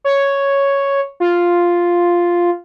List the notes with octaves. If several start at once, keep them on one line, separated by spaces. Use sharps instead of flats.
C#5
F4